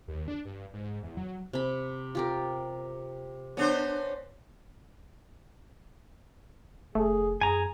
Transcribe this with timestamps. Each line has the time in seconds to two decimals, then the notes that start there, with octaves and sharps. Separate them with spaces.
0.08 D#2
0.28 D4
0.45 G2
0.73 G#2
1.03 E2
1.17 F#3
1.53 C3 B5
2.15 F4 G4 A#4
3.57 B3 C#4 D4 C5
6.95 F1 A3 G#4
7.41 F#2 G#4 G#5 A#5